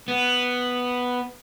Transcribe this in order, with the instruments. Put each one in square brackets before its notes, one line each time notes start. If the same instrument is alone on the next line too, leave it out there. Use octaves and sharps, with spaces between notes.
[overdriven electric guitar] B3